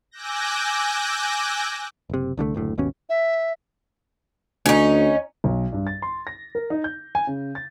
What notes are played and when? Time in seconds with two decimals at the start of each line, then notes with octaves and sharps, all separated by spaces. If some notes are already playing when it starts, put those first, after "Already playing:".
0.11 G#5 D6 E6 F#6 G6 A#6
2.10 F#1 C3
2.37 C2 D3 G3 A3
2.54 F#1 D2 A2
2.78 G#1 D#2 B2 C#4
3.09 E5
4.66 D2 C#4 D#4
5.44 B1
5.73 G2
5.87 A6
6.02 C6
6.27 A#6
6.55 A#4
6.70 D#4
6.84 G6
7.15 G#5
7.27 C#3
7.55 A6